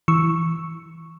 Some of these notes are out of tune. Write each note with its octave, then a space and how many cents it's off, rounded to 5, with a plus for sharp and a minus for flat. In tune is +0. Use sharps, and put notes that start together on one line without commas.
E3 +0 C#6 +0 E6 +0